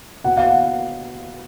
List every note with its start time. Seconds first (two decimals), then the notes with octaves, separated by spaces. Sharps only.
0.24 B2 F#5
0.37 F5
0.50 F#5